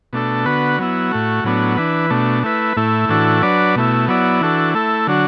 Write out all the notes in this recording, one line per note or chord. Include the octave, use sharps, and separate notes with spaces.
B2 A3 D4 A4
D3 B3 F#4 B4
F#3 B3 E4
A2 A3 F#4
A2 F#3 B3 D4
E3 D4 B4
B2 A3 D4
A3 E4 B4
A2 A3 E4
A2 E3 D4 F#4 A4
F#3 D4 B4 D5
B2 A3 E4
F#3 B3 E4 D5
E3 D4 F#4 A4
A3 E4 A4
D3 F#3 D4 F#4